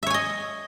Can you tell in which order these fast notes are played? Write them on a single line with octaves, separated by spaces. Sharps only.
E5 C#5 G#5 D#5